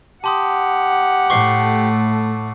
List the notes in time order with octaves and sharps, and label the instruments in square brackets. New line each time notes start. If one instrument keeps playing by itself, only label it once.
[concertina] G4 [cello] F#5 [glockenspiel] A5 C6 D#6
[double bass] A2 A3 [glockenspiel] C#6 D6 C7